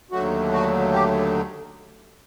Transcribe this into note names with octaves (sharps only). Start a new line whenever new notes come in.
D#2 D3 F#3 A3 F#4
F#4
G4